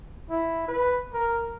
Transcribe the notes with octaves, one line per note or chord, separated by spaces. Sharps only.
E4
B4
A#4